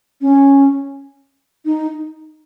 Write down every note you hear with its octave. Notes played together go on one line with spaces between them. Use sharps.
C#4
D#4